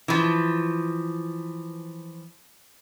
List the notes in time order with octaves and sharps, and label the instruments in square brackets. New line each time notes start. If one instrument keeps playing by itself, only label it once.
[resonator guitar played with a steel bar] E3 F3